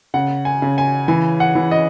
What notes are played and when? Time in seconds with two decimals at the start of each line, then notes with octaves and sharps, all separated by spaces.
0.14 C#3 F#5
0.45 G#5
0.62 C#3
0.78 G#5
1.08 E3 G#5
1.40 F#5
1.55 E3
1.71 D#5